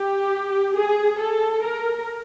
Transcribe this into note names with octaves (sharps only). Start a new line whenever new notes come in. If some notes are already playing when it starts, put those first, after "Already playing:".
Already playing: G4
G#4
A4
A#4